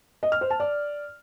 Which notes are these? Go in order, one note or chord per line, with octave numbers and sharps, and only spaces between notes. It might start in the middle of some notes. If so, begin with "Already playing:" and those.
D#5
F6
C5
A5
D5